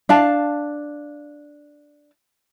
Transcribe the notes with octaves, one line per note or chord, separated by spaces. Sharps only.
D4 F5 A5